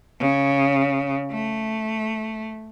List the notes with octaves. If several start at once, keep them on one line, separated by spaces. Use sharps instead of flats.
C#3
A3